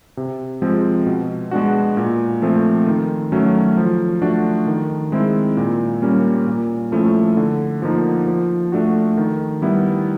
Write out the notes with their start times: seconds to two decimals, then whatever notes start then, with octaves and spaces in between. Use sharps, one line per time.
0.17 C3
0.62 F3 G#3 C4
1.06 B2
1.51 G#3 B3 D4 F#4
1.97 A#2
2.42 F3 A3 C4
2.87 D#3
3.32 F#3 A3 C#4
3.77 F3
4.22 A3 D4 F#4
4.67 D#3
5.12 G#3 C4 E4
5.57 A#2
6.02 G3 A#3 C#4
6.47 A#2
6.92 F3 A3 C#4 E4
7.37 D3
7.82 F3 A#3 D#4
8.27 F3
8.72 A3 D4 F#4
9.17 D#3
9.62 G3 B3 E4